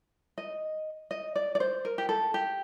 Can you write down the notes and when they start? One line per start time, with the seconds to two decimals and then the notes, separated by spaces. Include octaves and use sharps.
0.38 D#5
1.11 D#5
1.36 D5
1.55 D5
1.60 C5
1.85 A#4
1.98 G4
2.09 A4
2.34 G4